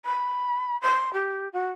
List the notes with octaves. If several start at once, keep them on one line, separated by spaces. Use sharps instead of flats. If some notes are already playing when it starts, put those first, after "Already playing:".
B5
C6
G4
F#4